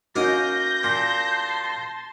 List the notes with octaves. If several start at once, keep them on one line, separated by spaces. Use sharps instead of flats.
A#3 C#4 D#4 F#4 A#4 D#5 G6 A#6
A#2 A5 C6